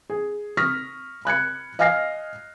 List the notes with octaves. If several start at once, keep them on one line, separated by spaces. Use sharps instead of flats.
G#4
C#6 D#6 F6 A#6 B6
B5 F#6 G#6 C#7
D#5 F5 G#5 F6 A#6 C7